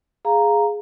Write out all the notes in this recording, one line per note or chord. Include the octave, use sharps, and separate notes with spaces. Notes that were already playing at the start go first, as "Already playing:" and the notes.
G#4 F5 A#5